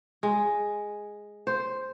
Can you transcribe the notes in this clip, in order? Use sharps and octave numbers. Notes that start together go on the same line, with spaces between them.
G#3
C5